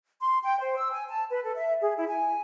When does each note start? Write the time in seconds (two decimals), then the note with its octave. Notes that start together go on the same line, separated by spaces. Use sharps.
0.20 C6
0.42 G5
0.59 C5
0.77 E6
0.91 G#5
1.07 A5
1.30 B4
1.43 A4
1.55 E5
1.82 G#4
1.96 E4
2.07 G#5